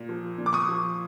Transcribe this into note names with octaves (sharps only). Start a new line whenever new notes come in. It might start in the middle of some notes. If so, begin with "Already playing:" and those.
Already playing: A#2
F3
A#2
D6
C#6 D#6
F3